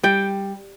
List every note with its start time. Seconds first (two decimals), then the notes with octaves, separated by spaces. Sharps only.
0.03 G3 G5